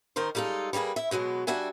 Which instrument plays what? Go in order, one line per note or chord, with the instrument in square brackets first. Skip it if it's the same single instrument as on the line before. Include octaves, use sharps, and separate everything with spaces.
[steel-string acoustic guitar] D#3 D#4 A#4 C5
G3 G#3 D#4 F4 A4
G3 A#3 B3 G#4 B4
E4 E5
B2 F#3 G#3 B3
G3 D4 F#4 E5 G#5